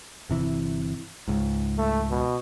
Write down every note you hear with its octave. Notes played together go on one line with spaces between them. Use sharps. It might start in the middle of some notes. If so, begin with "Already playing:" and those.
G1 C3 E3
C#2 G#2
A3
B2